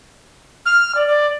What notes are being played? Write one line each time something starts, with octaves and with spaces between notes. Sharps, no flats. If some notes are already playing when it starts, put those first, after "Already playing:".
F6
D5
D5